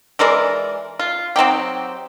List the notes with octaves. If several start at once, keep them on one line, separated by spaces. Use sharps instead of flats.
E3 G#3 A#4 D5
F4
F#3 C4 D#4 G4